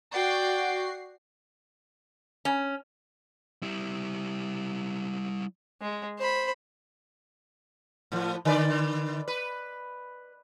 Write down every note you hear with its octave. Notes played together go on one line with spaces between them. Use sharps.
F#4 D5 G5 C7
C#4
G3 E4
G#3
C5 B5
A2 F3
D3 B4 D5
B4